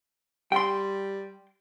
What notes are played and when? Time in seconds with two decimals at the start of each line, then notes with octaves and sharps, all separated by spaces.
0.52 G3 G5 C6